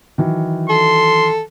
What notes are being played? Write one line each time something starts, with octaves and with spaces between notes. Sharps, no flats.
D#3 E3 F#3
A4 C6